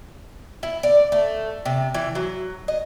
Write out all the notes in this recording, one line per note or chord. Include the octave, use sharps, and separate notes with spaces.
E4
D5
A3
C3
E3
F#3
D#5